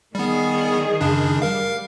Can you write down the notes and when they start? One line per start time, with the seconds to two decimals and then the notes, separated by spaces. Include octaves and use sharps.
0.15 D#3 G3 B3 G#4
1.01 F#2 C#3 D4
1.42 G3 A#4 F5